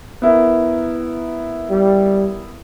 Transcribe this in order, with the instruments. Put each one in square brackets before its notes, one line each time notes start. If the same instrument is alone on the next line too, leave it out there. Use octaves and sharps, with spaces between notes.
[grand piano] B3 E4 A#4
[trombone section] G3